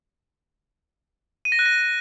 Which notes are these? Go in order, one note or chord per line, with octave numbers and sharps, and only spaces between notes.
D#7
A#6
F#6
A#6